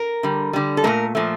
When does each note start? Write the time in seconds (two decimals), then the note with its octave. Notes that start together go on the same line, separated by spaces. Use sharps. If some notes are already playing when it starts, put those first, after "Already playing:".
Already playing: A#4
0.23 D3 G3
0.53 D3 G3
0.77 A4
0.84 A#2 F3 A3 A#4
1.15 A#2 F3 A3